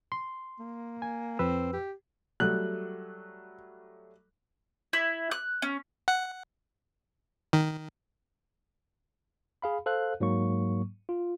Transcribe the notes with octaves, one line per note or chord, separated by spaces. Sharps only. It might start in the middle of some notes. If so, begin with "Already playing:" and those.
C6
A#3
G#5
F2 C4 B4 E6
G4
F#3 G3 A3 F#6
E4
F#6
C#4
F#5
D#3
G#4 F5 B5
A4 C5 F5 F#6
G#2 F#3 A#3 C#6
F4